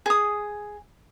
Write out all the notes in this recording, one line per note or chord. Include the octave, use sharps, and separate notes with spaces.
G#4 D#6